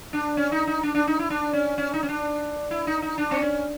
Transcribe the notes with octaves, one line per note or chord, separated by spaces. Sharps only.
D4
C#4
D#4
D#4
D4
D4
D#4
E4
D4
C#4
C#4
D#4
C#4
D4
E4
D#4
D#4
D4
C4
C#4